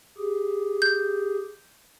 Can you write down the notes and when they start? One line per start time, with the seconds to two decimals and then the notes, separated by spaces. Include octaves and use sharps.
0.18 G4 G#4
0.82 G6